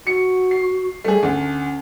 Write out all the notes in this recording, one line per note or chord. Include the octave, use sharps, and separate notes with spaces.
F#4 C#7
C7
G3 A3 G#4
D2 C#4